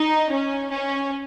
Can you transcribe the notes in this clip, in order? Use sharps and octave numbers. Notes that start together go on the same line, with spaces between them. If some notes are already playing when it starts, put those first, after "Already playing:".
Already playing: D#4
C#4
C#4